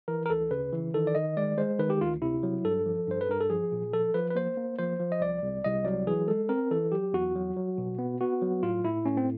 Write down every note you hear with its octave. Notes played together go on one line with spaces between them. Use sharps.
E3 A#4
A#4
D2 A4
C#3 B4
E3
D#3 A4
D5
D#3 D#5
G#3 D5
G#3 C5
D#3 B4
G4
D2 F4
C3 E4
F#3
G2 A4
F3
G2 C5
B4
G2 A#4
A4
F3 G#4
A#2
F3 A4
F3 B4
B4
A#3 C5
A#3
F3 C5
F3
D#5
C2 D5
C2
C2 D#5
F#3 D5
E3 G#4
G#3 A4
C4 A#4
E3 A4
F#3 G4
E2 F#4
F#3
F#3
B2
B3
B3 F#4
F#3
A2 F4
A2 E4
A2 C#4
C4